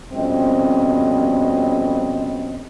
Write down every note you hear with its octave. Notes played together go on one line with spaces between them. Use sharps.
F2 B2 G3 C4 C#4 D#5